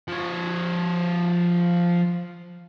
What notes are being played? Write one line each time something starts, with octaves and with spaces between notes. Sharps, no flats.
F3 C#5